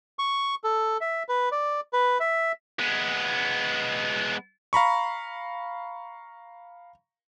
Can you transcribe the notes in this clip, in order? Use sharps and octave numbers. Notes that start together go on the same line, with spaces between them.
C#6
A4
E5
B4
D5
B4
E5
G#3 B3
F5 A#5 B5 C#6